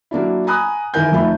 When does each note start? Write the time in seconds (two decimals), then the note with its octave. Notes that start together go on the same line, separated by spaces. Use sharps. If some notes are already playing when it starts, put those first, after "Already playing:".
0.11 F#3 A#3 D4 E4
0.47 G#5 A#5 B5 D#6 F#6
0.94 G#1 E3 E4 A#4 G#5 G6
1.12 F2 A3 D#4 F4 E5 B5